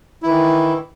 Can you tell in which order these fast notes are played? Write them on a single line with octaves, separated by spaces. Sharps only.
E4 E3 D#3